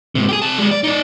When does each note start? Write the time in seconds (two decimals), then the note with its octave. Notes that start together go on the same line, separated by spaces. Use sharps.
0.15 G#2 C3
0.28 G4 G#4
0.42 C3 A5
0.58 G3 G#3
0.71 D5
0.84 D#4 D5